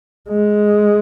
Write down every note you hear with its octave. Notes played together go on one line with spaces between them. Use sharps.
G#3